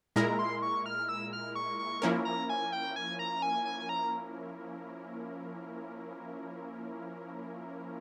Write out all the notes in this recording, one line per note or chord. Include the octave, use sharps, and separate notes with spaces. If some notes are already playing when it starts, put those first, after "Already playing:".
A#2 G#3 E4 A#4 A#5
C6
C#6
F6
E6
F6
C#6
C#6
F3 A#3 C#4 E4 A#4
A#5
G#5
G5
G#5
A#5
A#5
G#5
G#5
G#5
A#5